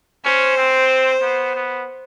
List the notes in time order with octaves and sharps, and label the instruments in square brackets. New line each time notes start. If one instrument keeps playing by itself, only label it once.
[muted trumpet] C#4 [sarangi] C5
[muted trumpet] C4
B3
B3